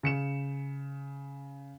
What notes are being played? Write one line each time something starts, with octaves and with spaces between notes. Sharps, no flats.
C#3 C#7 E7